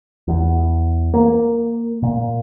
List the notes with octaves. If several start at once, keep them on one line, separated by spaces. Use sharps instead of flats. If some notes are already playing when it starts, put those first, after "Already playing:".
E2
A#3
A#2